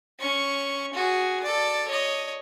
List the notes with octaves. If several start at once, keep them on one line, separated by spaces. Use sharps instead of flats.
C#4 C#6
F#4 G#4
A4 D5
C#5 D#5